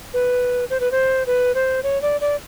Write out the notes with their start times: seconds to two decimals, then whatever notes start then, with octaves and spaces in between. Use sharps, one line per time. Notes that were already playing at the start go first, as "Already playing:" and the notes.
0.14 B4
0.70 C5
0.80 B4
0.92 C5
1.27 B4
1.55 C5
1.83 C#5
2.02 D5
2.21 D5